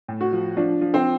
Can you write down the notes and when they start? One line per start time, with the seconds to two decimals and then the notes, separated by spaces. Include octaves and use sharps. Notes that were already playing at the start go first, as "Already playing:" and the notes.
0.08 A2
0.21 F#4
0.32 F3
0.57 F3 D4
0.81 F3
0.94 C4